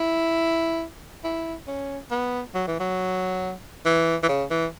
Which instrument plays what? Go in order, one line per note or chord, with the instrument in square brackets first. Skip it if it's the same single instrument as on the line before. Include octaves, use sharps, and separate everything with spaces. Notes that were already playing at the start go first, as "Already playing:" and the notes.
Already playing: [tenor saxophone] E4
E4
C#4
B3
F#3
E3
F#3
E3
E3
C#3
E3